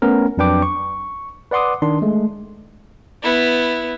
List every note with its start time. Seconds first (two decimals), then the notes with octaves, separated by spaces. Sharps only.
0.02 A3 B3 C#4 A#4
0.37 F2 F#3 D4 B4 G5 D6
0.62 C#6
1.51 B4 D5 F#5 C6 D6 D#6
1.82 D#3 D4 C6
2.02 G#3 A3
3.23 B3 E4